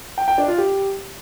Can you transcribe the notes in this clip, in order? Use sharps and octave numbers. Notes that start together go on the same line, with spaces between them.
G5
G5
D4
F4
G4